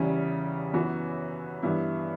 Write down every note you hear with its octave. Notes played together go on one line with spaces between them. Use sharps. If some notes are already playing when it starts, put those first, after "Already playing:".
Already playing: E2 C#3 G3 C#4 E4
F#2 E3 B3 F#4
G2 E3 B3 E4